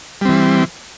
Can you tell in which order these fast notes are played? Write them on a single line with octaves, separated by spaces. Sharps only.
G3 C4 E3